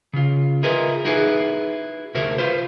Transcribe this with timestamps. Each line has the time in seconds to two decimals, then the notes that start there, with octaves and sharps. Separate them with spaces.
0.13 C#3 F4
0.63 E4 F4 G#4 A#4 B4 D#5
1.05 D#4 E4 F#4 G#4 B4
2.14 D2 C3 E4 F#4 A#4 C5
2.38 F4 B4 C5